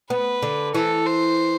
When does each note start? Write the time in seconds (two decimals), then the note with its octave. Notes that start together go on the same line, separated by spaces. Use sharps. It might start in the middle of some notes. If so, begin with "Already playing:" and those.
0.10 B3 B4
0.42 D3
0.74 E3 A4
1.06 C5